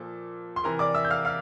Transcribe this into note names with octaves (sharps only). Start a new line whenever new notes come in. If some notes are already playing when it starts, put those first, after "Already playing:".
Already playing: A#2 F3 A4
C6
C3 E3 A#4 A#5
D5 D6
E5 E6
G6
F5 F6
F5 F6